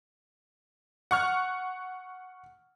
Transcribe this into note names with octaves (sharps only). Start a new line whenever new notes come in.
F#5 C#6 F6